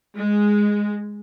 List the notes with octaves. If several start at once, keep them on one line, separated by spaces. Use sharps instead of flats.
G#3